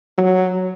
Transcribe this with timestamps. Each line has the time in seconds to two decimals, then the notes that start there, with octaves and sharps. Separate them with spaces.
0.18 F#3